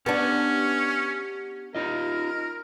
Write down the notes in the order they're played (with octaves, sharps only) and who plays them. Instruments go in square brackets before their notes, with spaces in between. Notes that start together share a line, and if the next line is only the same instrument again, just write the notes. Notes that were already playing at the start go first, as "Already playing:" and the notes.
[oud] B3 D4 [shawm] C#4 [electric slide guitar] G4 F#5
[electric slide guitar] D#4 F4 D#5 [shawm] A#4